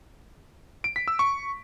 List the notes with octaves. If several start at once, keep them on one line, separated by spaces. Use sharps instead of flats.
D7
B6
E6
C#6